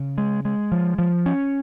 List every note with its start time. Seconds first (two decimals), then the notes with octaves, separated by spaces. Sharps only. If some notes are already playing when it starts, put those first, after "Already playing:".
Already playing: C#3
0.18 G#3
0.45 G#3
0.72 F3
0.98 F3
1.26 C#4